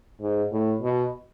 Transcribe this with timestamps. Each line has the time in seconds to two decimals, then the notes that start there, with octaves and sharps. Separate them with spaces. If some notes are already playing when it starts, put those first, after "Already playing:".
0.21 G#2
0.52 A2
0.82 B2